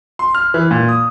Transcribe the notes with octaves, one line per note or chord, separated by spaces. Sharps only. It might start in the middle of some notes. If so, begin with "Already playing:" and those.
C6
F6
E3
A#2
D#6